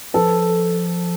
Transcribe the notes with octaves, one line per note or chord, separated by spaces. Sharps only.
F3 A4 B4